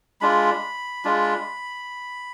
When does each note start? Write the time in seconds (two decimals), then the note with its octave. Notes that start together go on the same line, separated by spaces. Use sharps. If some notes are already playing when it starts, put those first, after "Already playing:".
0.21 G#3 D4 F4 B5
1.05 G#3 D4 F4